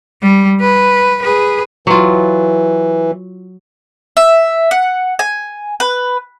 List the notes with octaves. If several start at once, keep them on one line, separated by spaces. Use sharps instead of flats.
G3
B4
G#4 B4
E3 F#3 F4
E5
F#5
G#5
B4